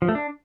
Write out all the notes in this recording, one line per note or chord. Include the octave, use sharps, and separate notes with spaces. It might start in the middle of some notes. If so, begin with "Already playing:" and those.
F3
A3
D4